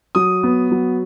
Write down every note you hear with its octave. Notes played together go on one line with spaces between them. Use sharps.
F#3 D#6
B3
F#3